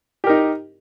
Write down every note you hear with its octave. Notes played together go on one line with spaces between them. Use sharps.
D#4 G4 A#4